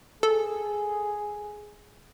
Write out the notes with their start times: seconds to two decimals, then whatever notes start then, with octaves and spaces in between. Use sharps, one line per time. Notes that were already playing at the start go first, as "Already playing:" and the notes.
0.23 G#4 A4